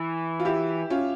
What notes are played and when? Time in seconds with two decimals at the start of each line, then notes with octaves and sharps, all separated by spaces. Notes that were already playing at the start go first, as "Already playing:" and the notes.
Already playing: E3
0.40 F4
0.45 E4 G4
0.90 C#4 F4